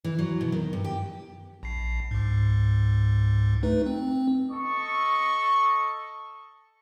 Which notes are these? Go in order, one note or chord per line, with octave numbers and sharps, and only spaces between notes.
E3
F#3
B2
D#3
G2
G4
A#1 C7
C#2 G#2
A3 D#4 B4
C4
A4 D#5 C#6